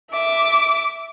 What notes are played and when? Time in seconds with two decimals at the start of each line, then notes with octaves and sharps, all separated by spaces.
0.12 E5 D6